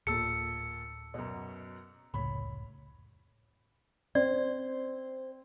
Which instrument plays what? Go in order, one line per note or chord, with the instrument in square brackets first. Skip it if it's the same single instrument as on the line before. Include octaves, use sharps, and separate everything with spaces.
[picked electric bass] D1 A#3 [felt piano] A#2 A4 [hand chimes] E6 C#7
[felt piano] F#2 B2
[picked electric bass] F1 C#2 A2 [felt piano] C#5 B5
[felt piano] C4 [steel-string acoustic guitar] C5 [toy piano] D5